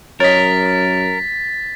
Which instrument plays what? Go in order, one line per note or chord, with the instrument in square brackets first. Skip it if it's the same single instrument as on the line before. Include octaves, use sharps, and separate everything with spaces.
[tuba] F#2 [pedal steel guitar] A#4 [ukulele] C#5 D#5 [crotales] A6 B6